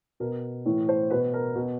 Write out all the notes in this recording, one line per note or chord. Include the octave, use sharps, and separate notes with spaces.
B2 A#4
A2 E3
C5
B2 B4
A#4
B2